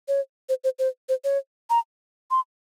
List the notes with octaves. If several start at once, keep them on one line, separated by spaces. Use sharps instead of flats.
C#5
C5
C5
C5
C5
C#5
A#5
C6